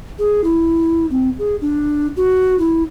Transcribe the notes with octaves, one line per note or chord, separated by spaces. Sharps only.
G#4
E4
C4
G#4
D4
F#4
E4